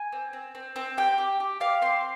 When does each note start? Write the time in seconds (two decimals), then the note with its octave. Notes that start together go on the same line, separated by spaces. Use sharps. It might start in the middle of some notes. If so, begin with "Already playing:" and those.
Already playing: G#5
0.12 C4
0.33 C4
0.55 C4
0.76 C4
0.97 G4 G5
1.18 G4
1.40 G4
1.60 G4 F5
1.82 C4 C6